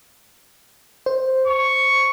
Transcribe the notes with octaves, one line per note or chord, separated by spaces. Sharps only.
C5
C#6